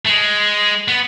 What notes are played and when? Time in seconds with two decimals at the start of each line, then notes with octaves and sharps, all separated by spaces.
0.05 A3
0.09 G#3
0.88 B3